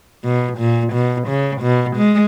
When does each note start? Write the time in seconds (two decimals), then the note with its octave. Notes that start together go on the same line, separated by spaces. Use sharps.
0.25 B2
0.59 A#2
0.93 B2
1.28 C#3
1.62 B2
1.97 G#3